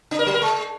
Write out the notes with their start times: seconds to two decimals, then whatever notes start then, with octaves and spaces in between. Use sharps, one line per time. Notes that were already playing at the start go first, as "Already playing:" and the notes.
0.11 D4
0.19 A#4
0.26 F#3
0.34 A#4
0.42 G#3